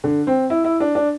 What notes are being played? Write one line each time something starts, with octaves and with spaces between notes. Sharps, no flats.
D3
C4
E4
E4
D4
D4